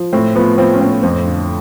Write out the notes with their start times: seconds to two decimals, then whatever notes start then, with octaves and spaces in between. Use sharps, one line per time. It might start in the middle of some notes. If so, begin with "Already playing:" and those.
Already playing: F3
0.13 A2 C4
0.35 F3 B3
0.58 F3 C4
0.74 C#4
0.80 A2 C4
1.03 F2 C4
1.26 D3